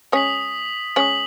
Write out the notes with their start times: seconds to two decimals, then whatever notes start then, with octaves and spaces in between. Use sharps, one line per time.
0.12 G#3 C#4 D#6 B6 F#7
0.96 G#3 C#4 D#6 B6 F#7